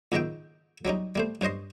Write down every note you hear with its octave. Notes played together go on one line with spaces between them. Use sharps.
C#2 G#2 D#3 G#3 E5 G5
F#3 G3 C#4 D#4
G3 A3 C5
G2 C#4 C5 D#5 C6